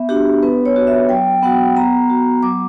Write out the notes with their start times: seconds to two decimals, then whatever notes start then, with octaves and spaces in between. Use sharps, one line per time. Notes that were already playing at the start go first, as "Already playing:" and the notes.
Already playing: B3 E5
0.09 D4 F#4 G4
0.43 B3 B4
0.66 C#5
0.76 F#4
0.87 E5
1.09 F#3 G5
1.42 B3 F#4 F#5
1.76 B3 A#5
2.10 F#4
2.43 F#3 D6